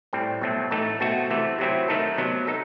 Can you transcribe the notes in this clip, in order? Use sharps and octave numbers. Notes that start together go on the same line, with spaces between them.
A2 G3 C4
B2 F#3 A3 C4
A2 E3 A3 D#4 A4
B2 A3 C4 F#4 A4
C3 E3 A3
C3 F#3 C4 E4
D#3 A3 D#4 A4
C3 F#3 B3
D#4 A4